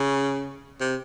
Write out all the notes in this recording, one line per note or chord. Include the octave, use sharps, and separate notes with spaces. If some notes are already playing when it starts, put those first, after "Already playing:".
Already playing: C#3
C3